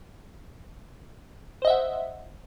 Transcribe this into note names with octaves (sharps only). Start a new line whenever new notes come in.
C5 D#5 E5 F#5